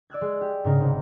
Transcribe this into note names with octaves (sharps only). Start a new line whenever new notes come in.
D5 E6 F#6 G#6
G#3
G4
G#2 C#3 A#4
G#1 C3